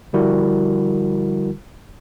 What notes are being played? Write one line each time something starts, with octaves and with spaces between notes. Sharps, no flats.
D3 F3 G3 E4 F#4 A#4